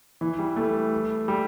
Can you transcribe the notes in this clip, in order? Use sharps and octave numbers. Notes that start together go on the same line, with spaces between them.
E3
G3
A3
G3